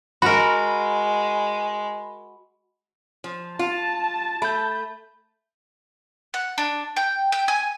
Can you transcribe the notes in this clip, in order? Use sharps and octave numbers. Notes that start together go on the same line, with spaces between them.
G#3 F#4 A#4 B5
F3
F4 A5
A3 B5 G6
F#5
D4
G5
G5
G#5